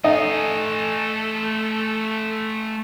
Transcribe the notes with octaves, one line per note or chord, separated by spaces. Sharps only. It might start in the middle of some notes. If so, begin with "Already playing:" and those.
A3 D#4 A4 G#5